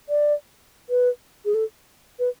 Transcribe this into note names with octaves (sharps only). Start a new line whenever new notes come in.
D5
B4
G#4
A4
B4